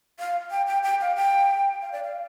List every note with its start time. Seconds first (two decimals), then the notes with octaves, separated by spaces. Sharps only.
0.19 F5
0.51 G5
0.67 G5
0.83 G5
1.01 F5
1.16 G5
1.82 F5
1.92 D5
2.04 F5